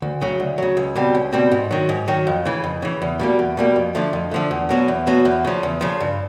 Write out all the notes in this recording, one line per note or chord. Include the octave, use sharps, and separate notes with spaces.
D2
C#3 F#3
D2
C#3 F#3
C#2
B2 G3 C4
C#2
B2 G3 C4
G#2
D#3 F#3
G#2
D#3 F#3
F2
C#3 E3
F2
C#3 E3
E2
B2 G3 A#3
E2
B2 G3 A#3
F2
D3 F3 A3
F2
D3 F3 A3
E2
B2 F#3 B3
E2
B2 F#3 B3
E2
C#3 F3
E2
C#3 F3
G2